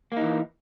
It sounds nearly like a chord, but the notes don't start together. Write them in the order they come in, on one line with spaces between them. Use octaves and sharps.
A#3 D#4 E3